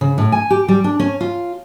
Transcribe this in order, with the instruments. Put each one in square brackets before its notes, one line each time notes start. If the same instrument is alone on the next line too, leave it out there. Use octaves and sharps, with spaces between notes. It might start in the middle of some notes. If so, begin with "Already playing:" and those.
[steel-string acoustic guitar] C#3
A2
G#5
G4
G3
D4
C#4
F4